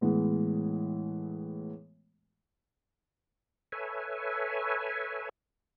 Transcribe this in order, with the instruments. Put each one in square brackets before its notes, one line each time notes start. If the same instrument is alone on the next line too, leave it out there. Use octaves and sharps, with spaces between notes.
[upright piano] A2 E3 G#3 B3
[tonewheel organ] A4 B4 C#5 E5 G#5